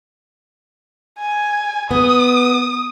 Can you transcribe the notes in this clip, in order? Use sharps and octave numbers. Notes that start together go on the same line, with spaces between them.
G#5
B3 D#6